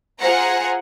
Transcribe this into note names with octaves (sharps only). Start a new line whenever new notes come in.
F4 G#4 C5 F#5 A#5